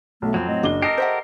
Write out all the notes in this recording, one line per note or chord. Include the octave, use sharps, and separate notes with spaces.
B1 A3
F2 F#3 C4
A2 D#5
F#1 D4 F#4 G7
G4 A4 A#4 D#6 A#6 C7
C5 E5 F#5